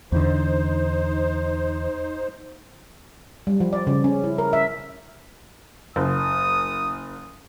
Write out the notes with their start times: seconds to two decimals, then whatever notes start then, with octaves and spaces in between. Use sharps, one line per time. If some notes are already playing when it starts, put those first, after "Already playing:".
0.12 E2 D3 D#4 C5
3.47 G3
3.60 F3
3.73 D5
3.87 C#3
4.04 C#4
4.24 E4
4.38 A#4
4.53 E5
5.96 F#1 D#6